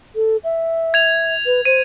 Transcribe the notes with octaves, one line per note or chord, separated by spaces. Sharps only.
A4
E5
G#6 F7
B4
C5 D#7